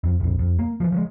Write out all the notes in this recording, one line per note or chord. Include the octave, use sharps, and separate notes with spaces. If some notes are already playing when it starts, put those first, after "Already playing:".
F2
A#1 F2
F2
A#3
E3 F3
F3 F#3 G#3